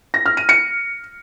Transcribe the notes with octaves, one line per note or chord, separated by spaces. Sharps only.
A#6
F6
D#7
C#7